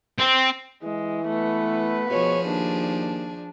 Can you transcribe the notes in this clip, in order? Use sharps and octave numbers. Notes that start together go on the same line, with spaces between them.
C4
E3 G#3
A3 B3 B4
B2 F3 G#4 C#5
D#2 D4